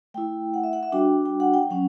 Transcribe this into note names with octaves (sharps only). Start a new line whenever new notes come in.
A3 E4 G5
F#5
E5
F#5
E5
G3 D4 F#4 G5
G5
F#5
G5
F#3 C#4 F#5